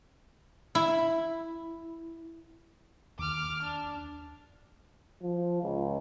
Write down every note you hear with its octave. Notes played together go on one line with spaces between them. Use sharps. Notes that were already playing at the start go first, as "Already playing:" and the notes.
E4
D#2 D6 F6
D4
F3
C#2